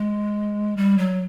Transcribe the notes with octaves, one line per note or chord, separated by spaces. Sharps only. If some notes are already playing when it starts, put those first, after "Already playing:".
Already playing: G#3
G3
F#3